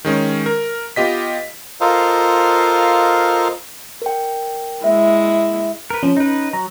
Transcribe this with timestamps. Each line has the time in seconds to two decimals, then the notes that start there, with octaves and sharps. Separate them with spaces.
0.05 D#3 G#3 C#4
0.46 A#4
0.96 B3 F4 G4 D#5 B6
1.81 F4 A4 A#4 C5 D#5 F5
4.02 A#4 G5
4.84 G#3 E4 E5
5.90 A#4 B4
6.03 F3 C#4
6.17 D#4 B4
6.53 F#3 A#5